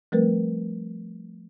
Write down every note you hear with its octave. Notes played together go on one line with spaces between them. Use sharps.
F3 G3 A3 C4 A#4 B4